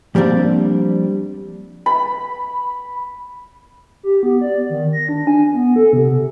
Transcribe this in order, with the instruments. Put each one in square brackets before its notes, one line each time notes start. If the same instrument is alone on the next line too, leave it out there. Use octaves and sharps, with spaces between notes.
[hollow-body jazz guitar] F3 G3 A#3 C4 D4
[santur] B5
[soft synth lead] G4
B3
D5
D#3
A#6
D4
G#5
B3
A4
C3